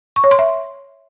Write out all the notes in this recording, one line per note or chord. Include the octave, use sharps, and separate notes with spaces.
C#6
C#5
C6
E5